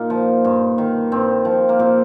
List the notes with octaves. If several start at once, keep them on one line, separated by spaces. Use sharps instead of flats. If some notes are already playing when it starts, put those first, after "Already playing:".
Already playing: A#2 D#4 F4
F3
G2
D#3
G2 C4
F3
A#3
A#2 C4